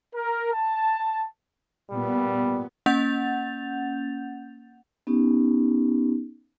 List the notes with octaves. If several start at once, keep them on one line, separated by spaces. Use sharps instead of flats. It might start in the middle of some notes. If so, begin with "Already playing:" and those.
A#4
A5
A#2 G3 B3
A#3 C#4 F#5 G6 A6 F7
B3 C#4 D#4 G4